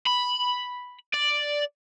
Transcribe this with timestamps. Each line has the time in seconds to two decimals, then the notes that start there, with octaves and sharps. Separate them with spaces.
0.07 B5
1.14 D5